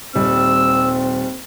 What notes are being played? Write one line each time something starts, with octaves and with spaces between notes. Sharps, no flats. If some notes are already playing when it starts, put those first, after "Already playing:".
D#1 G3 C4 E6